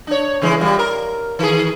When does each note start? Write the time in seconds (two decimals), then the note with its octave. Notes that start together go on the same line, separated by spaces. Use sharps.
0.07 D4 C#5
0.42 C#3 E3 G#3
0.60 A#2 G3
0.79 A#4
1.39 D#3 G#4